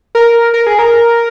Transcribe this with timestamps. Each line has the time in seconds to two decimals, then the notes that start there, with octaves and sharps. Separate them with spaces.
0.15 A#4
0.54 A#4
0.67 G#4
0.79 A#4